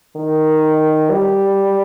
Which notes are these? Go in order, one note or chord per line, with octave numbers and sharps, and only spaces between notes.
D#3
G3